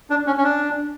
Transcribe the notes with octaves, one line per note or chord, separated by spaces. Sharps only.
D4
C#4
C#4
D4